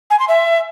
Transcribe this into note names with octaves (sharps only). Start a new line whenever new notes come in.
G#5
C6
E5